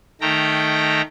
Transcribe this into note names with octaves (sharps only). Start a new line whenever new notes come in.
D#3 A3 G5 A#5